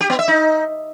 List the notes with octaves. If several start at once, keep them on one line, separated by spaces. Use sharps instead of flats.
G4
B3
E5
D#4